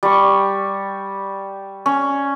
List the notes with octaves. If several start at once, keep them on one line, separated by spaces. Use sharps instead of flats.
G3 C#6
C#4